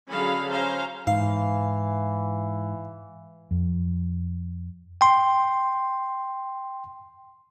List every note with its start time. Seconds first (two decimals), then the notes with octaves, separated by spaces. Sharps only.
0.11 D3 F#3 C#4 G#4 F5 B5
0.49 C#4 C5 F5 A#5
1.07 G#2 E3 F5
3.51 F2
5.01 G5 C6